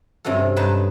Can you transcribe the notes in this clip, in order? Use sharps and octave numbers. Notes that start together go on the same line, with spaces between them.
G2 C3 C#4 F#4 A4
G2 F#3 D#4 B4 A5